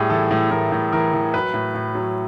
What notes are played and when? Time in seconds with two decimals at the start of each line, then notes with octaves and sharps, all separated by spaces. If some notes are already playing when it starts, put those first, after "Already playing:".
Already playing: A2 G3 G#4
0.10 E3 A4
0.31 A2
0.51 A2 A#4
0.72 A2
0.92 E3 A#4
1.13 E3
1.34 F#3 B4
1.54 A2
1.75 A2
1.95 F#3